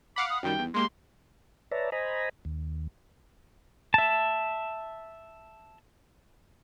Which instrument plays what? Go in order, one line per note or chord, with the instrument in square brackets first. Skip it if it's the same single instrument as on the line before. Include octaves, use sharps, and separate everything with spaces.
[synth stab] F5 F#5 B5 [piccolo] D6
[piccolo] D#6
[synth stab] F#2 D#3 G3 [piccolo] G5
[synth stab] E2
[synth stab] G#3 A#3 G4 [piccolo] C6
[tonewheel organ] B4 C#5 D5 E5 A5 A#5
C5 D#5 G#5 A#5 B5
D#2
[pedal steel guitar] E5 A5